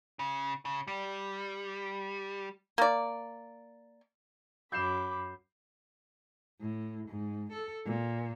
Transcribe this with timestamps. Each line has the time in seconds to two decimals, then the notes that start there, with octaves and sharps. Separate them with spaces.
0.19 C#3
0.65 C#3
0.88 G3
2.78 A#3 D5
4.72 F#2 B5 D6 G6 C7 E7
6.61 A2
7.09 G#2
7.52 A4
7.85 A#2